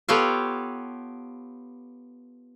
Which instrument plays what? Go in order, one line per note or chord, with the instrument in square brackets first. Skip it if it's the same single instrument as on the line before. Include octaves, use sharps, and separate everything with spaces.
[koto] B3 F4 G4 A4 C#5 F5